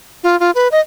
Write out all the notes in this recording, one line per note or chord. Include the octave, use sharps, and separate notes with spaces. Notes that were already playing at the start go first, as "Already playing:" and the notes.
F4
F4
B4
D#5